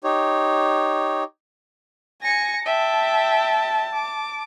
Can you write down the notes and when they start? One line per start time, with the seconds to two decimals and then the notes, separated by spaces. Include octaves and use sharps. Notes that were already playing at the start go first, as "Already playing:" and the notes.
0.04 D#4 G4 C#5
2.22 G#5 A#6 C#7
2.66 E5 G5 A5
3.94 D6